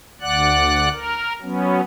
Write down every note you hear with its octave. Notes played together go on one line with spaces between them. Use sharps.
D2 D5 F#5 F#6
A#4
F#3 B3 C#4